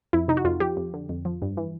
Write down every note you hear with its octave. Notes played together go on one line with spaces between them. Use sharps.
F2 E4
C3 D#4
F#4
F2 F4
F3 G4
F2
D3
F2
F3
G2
E3